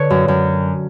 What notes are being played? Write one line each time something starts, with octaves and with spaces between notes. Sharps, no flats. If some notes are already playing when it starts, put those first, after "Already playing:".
Already playing: D3 B4 C#5
F#2
F#2